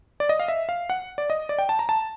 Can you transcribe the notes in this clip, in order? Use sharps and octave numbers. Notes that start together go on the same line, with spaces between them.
D5
D#5
F5
E5
F5
F#5
D5
D#5
D5
G5
A5
A#5
A5